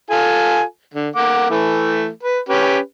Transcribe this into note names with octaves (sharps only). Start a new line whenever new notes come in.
F4 A4 G#5
D3
A#3 F#5 D6
E3 A3
B4
C#4 G4 B4